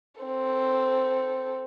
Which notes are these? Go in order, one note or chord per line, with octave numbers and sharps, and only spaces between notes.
C4 A4